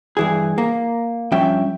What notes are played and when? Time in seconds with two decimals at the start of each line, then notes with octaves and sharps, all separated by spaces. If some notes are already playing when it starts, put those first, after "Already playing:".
0.17 G2 E3 G#4
0.58 A#3
1.32 G2 F3 C#4 E5 G5